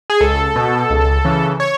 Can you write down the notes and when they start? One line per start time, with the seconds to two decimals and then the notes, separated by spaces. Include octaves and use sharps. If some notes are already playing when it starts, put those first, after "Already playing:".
0.10 G#4
0.21 C#2 A4
0.56 B2
0.90 C#2
1.25 C#3 E3
1.60 C#5